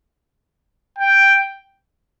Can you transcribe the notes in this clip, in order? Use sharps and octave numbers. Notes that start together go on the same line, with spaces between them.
G5